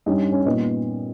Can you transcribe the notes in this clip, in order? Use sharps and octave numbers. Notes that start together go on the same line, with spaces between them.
G2 G3 C#4 D#4 D#5
C#4 C#5
A#2 G3 B3 D#4 D#5